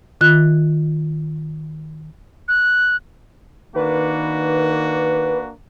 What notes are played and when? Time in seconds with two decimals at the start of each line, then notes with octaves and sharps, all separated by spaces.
0.21 D#3 F4 F#6
2.48 F#6
3.76 D#3 A#3 D4 F#4 B4